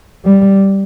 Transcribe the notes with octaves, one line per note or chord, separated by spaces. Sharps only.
G3